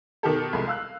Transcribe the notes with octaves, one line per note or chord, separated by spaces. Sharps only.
B2 D#3 G4 A4
C2 F2 G#3 C6
F5 E6 F#6